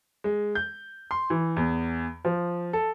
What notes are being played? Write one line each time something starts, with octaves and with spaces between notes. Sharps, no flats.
G#3
G6
C6
E3
E2
F3
A4